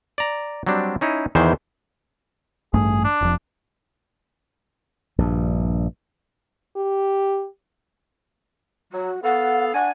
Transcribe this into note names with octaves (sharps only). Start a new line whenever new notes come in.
D5 A#5
F#3 G3 C4 D4
C#4 D#4 E4
E2 D#3 E3 C5
A1 G2 A3 G#4
D4
F1 F2
A#1 G2
G4
F#3 F#4
B3 A4 F5 F#5
D4 F#5 G#5